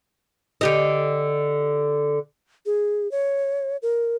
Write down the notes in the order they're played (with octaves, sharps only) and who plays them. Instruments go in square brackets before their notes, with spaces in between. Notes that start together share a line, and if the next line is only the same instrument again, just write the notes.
[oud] D3 G4 D#5
[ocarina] G#4
C#5
A#4